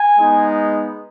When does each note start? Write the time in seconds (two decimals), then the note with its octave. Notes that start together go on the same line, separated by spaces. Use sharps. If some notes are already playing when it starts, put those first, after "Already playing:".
Already playing: G#5
0.17 G#3 B3 D#4